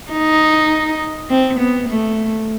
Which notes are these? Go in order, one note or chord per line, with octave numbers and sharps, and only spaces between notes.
D#4
C4
B3
A3